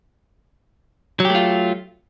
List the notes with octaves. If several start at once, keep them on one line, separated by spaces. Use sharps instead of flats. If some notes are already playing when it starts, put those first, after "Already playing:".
F#3 A3 F4 G4